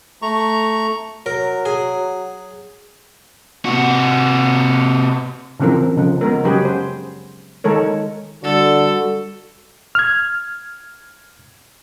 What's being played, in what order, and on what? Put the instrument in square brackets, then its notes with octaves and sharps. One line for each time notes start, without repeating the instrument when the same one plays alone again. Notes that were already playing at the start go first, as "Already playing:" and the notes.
[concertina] A3 A#5 C#6
[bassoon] F#3 [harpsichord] A#4
[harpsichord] G#4
[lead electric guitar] C3 F#4
[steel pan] C#3 E3 F3 C4 A#4
C#3 F3
G#3 B3 A#4
C#3 F#3 G4 G#4 B4
C5
D#3 G#3 A4 A#4 C#5
[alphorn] D3 [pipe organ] G3 F#4 [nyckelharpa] A4
[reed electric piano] F6 G#6